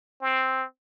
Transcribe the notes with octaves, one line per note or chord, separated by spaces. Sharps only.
C4